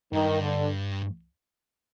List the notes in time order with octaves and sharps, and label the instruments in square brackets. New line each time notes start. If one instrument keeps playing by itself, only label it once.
[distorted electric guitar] G2 [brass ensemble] D#3
[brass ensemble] D3